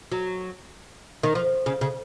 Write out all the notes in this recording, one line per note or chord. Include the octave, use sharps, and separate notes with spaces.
F#3
D#3
F3
C#3
C#3